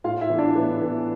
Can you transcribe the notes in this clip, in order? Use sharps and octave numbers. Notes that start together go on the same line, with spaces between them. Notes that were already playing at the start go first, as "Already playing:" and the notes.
A2 F4 F5
E4 E5
E3 B3
D4 D5
A2 B3 B4
E3 B3